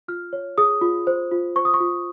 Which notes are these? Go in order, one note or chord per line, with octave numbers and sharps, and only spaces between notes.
F4 F6
C#5
G#4 D#6
F4
C5
F4
C5 C#6
D#6
C#6
F4